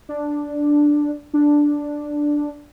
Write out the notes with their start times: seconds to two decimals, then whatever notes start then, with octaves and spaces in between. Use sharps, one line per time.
0.09 D4
1.34 D4